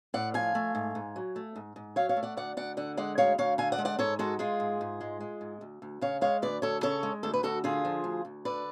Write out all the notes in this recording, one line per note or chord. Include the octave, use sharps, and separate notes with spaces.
A2 D5 F#5
F3 F5 G#5
A3
G#2
G#2
F#3
A3
G#2
G#2
F#3 C#5 F5
C#5 F5
A3
D5 F#5
D2 D5 F#5
D2 D5 F#5
D3 D5 F#5
G#3 D5 F#5
D2 C#5 F5
D2 C#5 F5
D3 F5 G#5
D5 F#5
G#3
D5 F#5
G#2 A4 C#5
G#3 F#4 A4
G#3 F4 G#4
G#2
G#2
G#3
G#3
G#2
D2
D2
C#3 C#5 F5
G#3 C#5 F5
D2 B4 D5
D2 A4 C#5
C#3 A4 C#5
G#3
D2 A4
B4
D2 F#4 A4
D3 F4 G#4
F3
D2
D2
D3 B4 D5